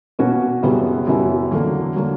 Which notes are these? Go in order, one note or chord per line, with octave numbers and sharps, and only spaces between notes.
B2 A#3 C#4 F#4 B4
F#2 C#3 G3 B3 E4
F#2 C#3 G3 B3 E4
E2 D3 F#3 A#3
D3 F#3 A#3